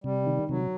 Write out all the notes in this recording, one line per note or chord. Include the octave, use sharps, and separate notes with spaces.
C3 G3
D#3
C3 F#3